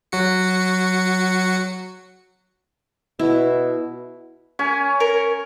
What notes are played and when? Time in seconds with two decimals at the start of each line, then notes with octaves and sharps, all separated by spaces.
0.12 F#3 F#4 C#7
3.19 B2 E4
4.59 C#4 G#5
5.00 A#4